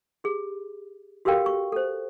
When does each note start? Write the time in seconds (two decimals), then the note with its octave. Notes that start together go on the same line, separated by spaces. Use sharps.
0.24 G4 G#4
1.25 F#4 G4 A4 A#4 F5 G5
1.46 C#6
1.72 A4 C5